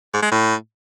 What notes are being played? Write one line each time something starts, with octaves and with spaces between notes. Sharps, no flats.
G#2
G#3
A2